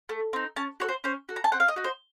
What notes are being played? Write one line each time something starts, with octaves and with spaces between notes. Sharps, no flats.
A3
C4 D#4
C#4 A5
F#4 A4 C#5
C5
C#4 C5
F#4 A4
A#5
A5
C4 F#5
F5
D#5
D#4 F#4
C5